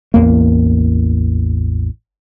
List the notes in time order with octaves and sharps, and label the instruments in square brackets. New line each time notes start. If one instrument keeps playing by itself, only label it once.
[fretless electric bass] A1 E2 A#3